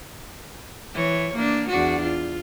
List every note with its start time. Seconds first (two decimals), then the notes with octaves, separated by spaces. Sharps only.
0.94 E3 C#5
1.35 A#3 D4
1.69 E2 D4 F#4
2.02 F4